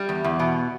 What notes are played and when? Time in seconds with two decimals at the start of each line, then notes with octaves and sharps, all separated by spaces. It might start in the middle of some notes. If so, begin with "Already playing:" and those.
Already playing: G3
0.09 E2
0.24 E2
0.39 B2